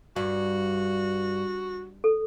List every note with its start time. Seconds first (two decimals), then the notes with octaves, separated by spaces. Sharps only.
0.16 G2 F#4
2.04 A4